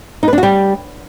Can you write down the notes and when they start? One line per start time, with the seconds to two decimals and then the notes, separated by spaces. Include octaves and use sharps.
0.23 D#4
0.28 B4
0.33 D4
0.38 F#4
0.43 G3